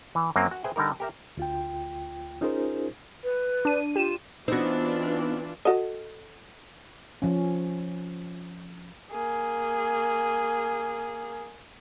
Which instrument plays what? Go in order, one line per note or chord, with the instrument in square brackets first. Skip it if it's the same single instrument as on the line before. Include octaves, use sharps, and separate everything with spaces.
[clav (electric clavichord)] E3
F#2 F#3 A#3 C4
F#4
G#4 B4 C5 E5 G5
D3 G3 D#4 A#4
G4 A#4 E5
[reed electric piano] D2 F4 G5
C#4 D#4 F4 G#4 A#4 C5
[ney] B4
[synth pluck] D4 D#7
[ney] F4 [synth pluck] G4 D#7 E7
[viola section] E3 D4 F4 [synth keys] B3 D#4 [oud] C4 F#4
[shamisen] F#4 A4 D#5
[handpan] F3 C#4
[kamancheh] A#3 G#4